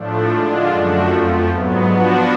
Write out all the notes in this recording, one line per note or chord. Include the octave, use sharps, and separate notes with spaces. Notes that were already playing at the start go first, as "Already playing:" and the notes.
Already playing: A2 F3 A3 D4
D3 G#3 D4 F4
F#2 F3 A3 D4 F#4
F2 F3 A3
G#2 F#3 B3
F3 B3 D4 F#4